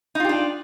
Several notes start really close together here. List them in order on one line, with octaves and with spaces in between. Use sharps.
D#4 F4 G4 D4